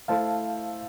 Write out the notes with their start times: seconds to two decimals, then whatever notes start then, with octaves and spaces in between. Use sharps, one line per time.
0.08 A3 E4 A4 C5 F5 A5